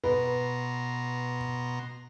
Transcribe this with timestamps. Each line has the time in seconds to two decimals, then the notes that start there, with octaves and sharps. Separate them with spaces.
0.04 B2 B4 A#5 C6